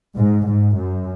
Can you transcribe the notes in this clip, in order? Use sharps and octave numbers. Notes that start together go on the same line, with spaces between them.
G#2
G#2
F#2